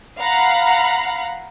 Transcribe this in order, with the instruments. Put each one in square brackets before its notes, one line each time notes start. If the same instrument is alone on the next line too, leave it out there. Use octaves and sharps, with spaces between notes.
[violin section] F5 F#5 A#5 B5